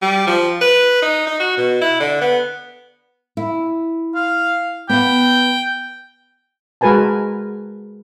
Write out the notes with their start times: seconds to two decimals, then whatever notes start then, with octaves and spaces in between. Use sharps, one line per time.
0.02 G3
0.27 F3
0.61 B4
1.02 D#4
1.27 D#4
1.40 F#4
1.57 B2
1.81 E4
2.00 D3
2.21 B3
3.37 E4
4.15 F5
4.89 B3 F#5 G5
6.81 G#3 F#4 A#4 B4 G#5 A5